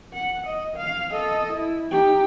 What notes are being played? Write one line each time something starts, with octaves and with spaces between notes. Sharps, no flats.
F#5
D#5
F5
A4 D#5
E4
D#4 G4